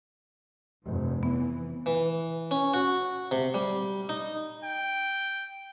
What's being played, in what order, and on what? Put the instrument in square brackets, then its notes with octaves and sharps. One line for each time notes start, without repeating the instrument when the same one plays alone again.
[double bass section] F1 G2
[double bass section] E3 [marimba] B3
[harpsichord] E3
C#4
F#4
C3
G3
D#4
[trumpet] G5